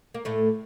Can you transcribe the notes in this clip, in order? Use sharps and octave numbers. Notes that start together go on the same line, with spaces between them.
A#3
A2 A3